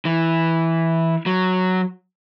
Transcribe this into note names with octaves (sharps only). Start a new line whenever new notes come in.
E3
F#3